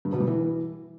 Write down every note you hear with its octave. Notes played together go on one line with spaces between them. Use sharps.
G2
B2
G3
E3